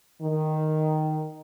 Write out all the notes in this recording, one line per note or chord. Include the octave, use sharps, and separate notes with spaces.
D#3